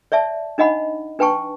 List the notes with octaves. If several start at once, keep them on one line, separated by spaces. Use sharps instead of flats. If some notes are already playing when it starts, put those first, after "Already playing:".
C#5 D5 E5 A5
D4 D#4 D#5 F#5 B5
D4 B4 G5 A5 C#6